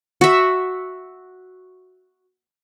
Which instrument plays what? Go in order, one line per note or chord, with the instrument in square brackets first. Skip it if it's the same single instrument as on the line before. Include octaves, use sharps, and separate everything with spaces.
[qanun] F#4 E5